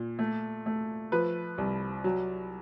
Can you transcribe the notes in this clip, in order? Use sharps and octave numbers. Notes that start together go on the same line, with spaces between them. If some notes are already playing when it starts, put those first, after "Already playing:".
Already playing: A#2
A3
A3
F3 B4
C2
F#3